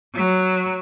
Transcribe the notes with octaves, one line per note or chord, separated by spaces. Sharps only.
F#3